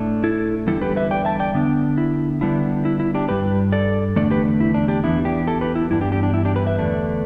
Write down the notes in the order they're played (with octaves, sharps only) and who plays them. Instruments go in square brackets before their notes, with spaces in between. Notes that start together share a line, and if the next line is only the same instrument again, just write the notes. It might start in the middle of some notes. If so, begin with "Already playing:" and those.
Already playing: [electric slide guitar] A2 A3 D4
E4 A4
E2 D3 G3 E4 A4
G4 B4
B4 E5
D5 G5
E5 A5
D5 G5
D3 B3 D4
E4
D3 G3 B3 D4 E4
E4
E4
D4 G4
G2 G3 D4 G4 B4
A4 D5
E2 D3 A3 D4 A4 D5
G4 B4
E4
D4
D4 G4
E2 E3 B3 D4 E4
D4 G4
E4 A4
G4 B4
E4
G2 E3 B3 D4 E4
D4 G4
D4 G4
D4
E4
D4 G4
G4 B4
B4 E5
E2 D3 A3 D4